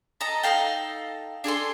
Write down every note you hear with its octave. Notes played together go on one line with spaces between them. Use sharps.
A4 D#5 A#5
D#4 A4 F5 G5
D4 G#4 A4 C6